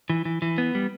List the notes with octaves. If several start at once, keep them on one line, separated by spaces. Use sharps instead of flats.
E3
E3
E3
B3
G3